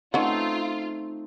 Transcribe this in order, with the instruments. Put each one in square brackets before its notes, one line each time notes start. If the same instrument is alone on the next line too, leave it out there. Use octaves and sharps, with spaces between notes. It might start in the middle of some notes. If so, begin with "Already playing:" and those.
[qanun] A3 C4 D#4 [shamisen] C#4 F#5 [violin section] F4